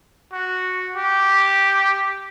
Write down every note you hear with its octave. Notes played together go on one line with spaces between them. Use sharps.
F#4
G4